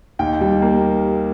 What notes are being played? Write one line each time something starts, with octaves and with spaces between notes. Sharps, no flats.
D#2 G5
G3
A#3